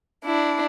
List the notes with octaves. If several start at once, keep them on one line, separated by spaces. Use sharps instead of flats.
D4 E4